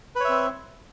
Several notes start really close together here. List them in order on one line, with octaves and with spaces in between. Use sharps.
B4 C#5 E5 C4